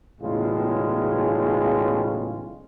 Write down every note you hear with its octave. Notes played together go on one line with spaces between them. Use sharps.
B1 E2 A2 C#3 G#3 F4